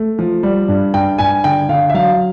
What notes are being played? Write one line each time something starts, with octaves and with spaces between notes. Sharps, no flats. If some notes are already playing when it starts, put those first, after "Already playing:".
Already playing: A3
F3
G3
G2
G2 G5
G2 G#5
D3 G5
D3 F5
E5
F#3 F5